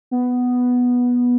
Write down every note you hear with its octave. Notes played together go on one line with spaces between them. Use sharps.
B3